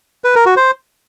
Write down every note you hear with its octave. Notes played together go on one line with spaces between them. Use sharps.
B4
A#4
F#4
C5